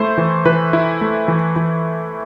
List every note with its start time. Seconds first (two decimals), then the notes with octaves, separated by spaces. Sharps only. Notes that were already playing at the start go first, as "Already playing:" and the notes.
Already playing: A3 E4 C5
0.18 E3
0.45 E3 B4
0.73 E4
1.01 A3
1.28 E3
1.56 E3